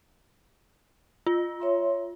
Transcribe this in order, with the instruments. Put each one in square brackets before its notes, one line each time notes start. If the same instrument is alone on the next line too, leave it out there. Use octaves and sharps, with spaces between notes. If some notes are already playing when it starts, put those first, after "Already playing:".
[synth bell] F4
[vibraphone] C#5 E5 C6